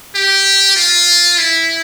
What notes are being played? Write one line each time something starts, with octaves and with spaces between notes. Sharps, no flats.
G4
F4
E4